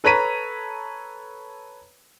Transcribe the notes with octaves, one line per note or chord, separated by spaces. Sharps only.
A4 B4 C#5 A#5 B6 D#7